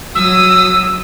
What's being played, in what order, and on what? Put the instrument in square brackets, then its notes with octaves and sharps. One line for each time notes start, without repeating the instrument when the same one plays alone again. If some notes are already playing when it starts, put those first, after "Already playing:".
[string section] F#3 D#6 [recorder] E6